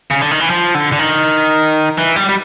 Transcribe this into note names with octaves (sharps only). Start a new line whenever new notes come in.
C#3
D3
D#3
E3
F3
D3
D3
D#3
E3
G3
G3